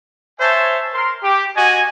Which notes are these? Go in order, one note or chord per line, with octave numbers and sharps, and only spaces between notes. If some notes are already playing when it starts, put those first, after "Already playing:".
C5 C#5 E5 G#5 A5
A#4 C6
G4
F#4 D#5 G#5